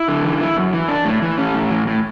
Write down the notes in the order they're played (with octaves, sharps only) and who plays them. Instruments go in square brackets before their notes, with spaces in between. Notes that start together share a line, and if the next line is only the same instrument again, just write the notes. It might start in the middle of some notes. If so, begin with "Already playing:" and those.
Already playing: [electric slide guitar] E4
D3
E3
E4
F#2
E3
D4
A2
E3
C#4
A2
E3
A2